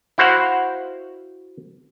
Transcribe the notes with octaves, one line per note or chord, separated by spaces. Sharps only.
E4 F#4 C5 F5 F#5